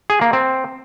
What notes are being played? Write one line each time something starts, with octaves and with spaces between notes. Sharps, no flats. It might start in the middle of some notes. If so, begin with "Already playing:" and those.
G#4
A#3
C4